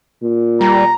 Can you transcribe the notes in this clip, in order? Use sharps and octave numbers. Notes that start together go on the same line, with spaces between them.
A#2
G3 A#5